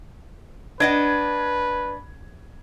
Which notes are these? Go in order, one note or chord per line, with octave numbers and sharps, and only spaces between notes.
D4 B4 D#5 F#5 G#6